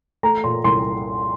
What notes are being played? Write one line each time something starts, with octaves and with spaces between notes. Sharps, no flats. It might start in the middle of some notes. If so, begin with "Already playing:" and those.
A3 A#5
A#2 C6
C2 C6